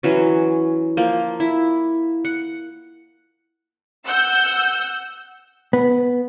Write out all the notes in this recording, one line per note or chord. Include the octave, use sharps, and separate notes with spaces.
E3 F#3 C#4
F3 A#3
E4
F#5
F#5 E6 G6
B3